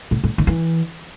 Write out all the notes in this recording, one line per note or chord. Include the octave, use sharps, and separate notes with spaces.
A2
A2
D#3
E3